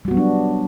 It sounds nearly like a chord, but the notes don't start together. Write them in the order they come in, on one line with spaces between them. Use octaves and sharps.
G3 F#4 B3 F#3 D4